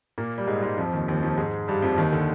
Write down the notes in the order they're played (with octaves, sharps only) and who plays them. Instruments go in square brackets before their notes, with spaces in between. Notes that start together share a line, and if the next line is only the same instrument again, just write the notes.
[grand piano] A#2 A#3
G3
G#2 G#3
G#2 G#3
F2 F3
D#2 D#3
D#2 D#3
F2 F3
G#2 G#3
G2 G3
F2 F3
D#2 D#3
D3